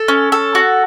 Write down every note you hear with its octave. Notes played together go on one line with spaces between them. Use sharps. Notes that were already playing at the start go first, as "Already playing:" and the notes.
Already playing: A4
C#4
A4
F#4